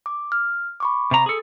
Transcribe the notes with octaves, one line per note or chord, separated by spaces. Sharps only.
D6
F6
B5 C#6 D6
C3 A#5
G#4 A4